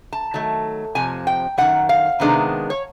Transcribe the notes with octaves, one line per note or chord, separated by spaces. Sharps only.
A5
D#3 F#3 A3
F2 C3 F3 G#5
G5
F#2 D#3 G3 F#5
F5
C3 D#3 G#3 B3 D4
C#5